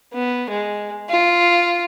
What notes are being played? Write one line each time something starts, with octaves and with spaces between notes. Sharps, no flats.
B3
G#3
F4